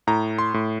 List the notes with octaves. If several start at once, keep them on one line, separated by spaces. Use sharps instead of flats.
A2 A#5
C6
A2